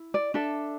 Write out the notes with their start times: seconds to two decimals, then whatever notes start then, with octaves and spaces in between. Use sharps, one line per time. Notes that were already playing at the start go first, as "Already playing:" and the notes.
Already playing: E4
0.14 D5
0.34 D4 A4 E5